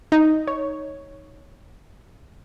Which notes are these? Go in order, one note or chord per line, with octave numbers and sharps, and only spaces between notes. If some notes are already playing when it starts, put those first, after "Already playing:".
D#4
C#5